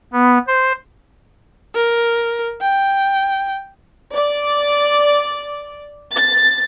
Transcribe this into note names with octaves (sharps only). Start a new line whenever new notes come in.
B3
C5
A#4
G5
D5
A6